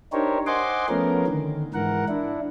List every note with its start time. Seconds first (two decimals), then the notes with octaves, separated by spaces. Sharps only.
0.13 D4 D#4 G4 A#4 C5 C#5
0.47 C5 D#5 F#5 G#5 C6 D6
0.89 F3 A3 B3 C#4 A#4
1.27 D3 D#3
1.74 G#2 E3 A#4 F#5
2.09 D4 E4